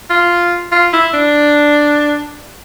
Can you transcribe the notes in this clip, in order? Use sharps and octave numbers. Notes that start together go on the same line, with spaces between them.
F4
F4
E4
D4